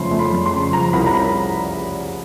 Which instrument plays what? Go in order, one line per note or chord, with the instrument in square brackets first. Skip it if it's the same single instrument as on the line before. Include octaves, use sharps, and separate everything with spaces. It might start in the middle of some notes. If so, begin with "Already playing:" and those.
Already playing: [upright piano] F2 C#3 F3 A3 B5 C6
A3
B5
F2
C6
C#3
F3 A#5
C2 B5
A#5
C2 B5